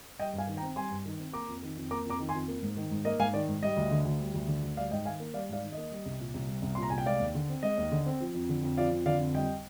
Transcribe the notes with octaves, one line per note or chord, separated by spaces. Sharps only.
G3 D#5 G5
G2
F5 G#5
D#3
G5 A#5
C4
G3 G#5 C6
G2
D#3
C4
A#3 A#5 D6
F2
D#3
F2
A#3 A#5 D6
F2 A#5 D6
D#3
G#5 C6
F2
A#3
G#2
D#3
G#2
A#3 D#5
G#2 F5 G#5
D#3 D5
G#2
G3 D#5
D2
D3
D2
G3
D2
D3
D2
G3 D5 F5
G#2 D#5 G5
D#3 F5 G#5
A#3
G3 D5 F5
G#2 D5 F5
D#3
A#3 D#5
G3
C2
A#2
C2
G3
C2
A#2 C6
A#5
C2 G#5
G5
G#3 D5 F5
D#2
D3
C4
G#3 D#5
D#2
D3
C4
F3
F2
D3
F2
F3 D5 F5
F2
D3 D5 F5
F2
G3 D#5 G5